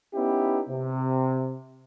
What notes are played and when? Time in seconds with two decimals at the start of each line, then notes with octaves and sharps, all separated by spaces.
0.14 B3 C#4 D#4 E4 G4
0.67 C3